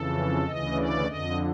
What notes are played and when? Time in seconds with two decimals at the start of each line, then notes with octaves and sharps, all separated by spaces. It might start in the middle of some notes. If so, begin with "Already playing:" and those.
Already playing: F2 C#3 E3 A4
0.46 D2 C#3 E3 D#5
0.76 D5
1.06 F2 D3 D#5